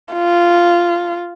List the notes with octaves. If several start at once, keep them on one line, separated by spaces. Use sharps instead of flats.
F4